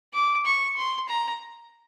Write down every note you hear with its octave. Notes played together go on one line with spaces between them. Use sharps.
D6
C#6
C6
A#5